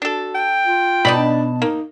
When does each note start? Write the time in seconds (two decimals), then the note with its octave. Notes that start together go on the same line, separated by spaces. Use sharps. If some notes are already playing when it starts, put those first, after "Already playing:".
0.02 D4 F#4 A4
0.35 G5
0.67 F4
1.05 B2 D#4 D5 A5 B5
1.18 D4
1.62 A#3 D#4